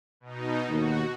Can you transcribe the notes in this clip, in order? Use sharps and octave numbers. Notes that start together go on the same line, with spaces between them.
B2 D#4
D#2 F#4